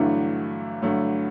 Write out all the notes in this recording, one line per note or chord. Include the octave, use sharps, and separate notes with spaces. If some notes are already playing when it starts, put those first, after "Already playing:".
Already playing: G2 D3 E3 F#3 A3 E4
G2 D3 F#3 A3